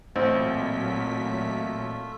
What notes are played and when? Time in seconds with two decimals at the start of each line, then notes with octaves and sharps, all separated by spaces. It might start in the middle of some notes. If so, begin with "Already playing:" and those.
0.16 A1 A#2 F#3 A3 C4 F4 E5 B6